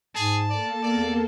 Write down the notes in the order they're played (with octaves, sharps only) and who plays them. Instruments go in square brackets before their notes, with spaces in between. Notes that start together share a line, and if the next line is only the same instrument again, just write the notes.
[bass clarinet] G#2 [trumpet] G#4 [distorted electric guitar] A5
[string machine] A#3 A4 [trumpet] D5
[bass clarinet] E2 [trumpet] D5